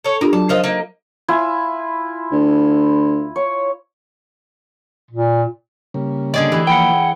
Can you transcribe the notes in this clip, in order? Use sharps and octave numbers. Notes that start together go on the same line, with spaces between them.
A4 C#5
D4 F4 G4 A#4
F#3 F#4 A5
F3 F4 A#4 C5 D#5
A#3 D#4
E4 F4 G#5
D2
C#5
A#2
C#3 G3 A#3
D3 G#4 D5 D#5
E3 A3 G4 G#4
F3 A#3 B4 F#5 G5 B5 D7
G#4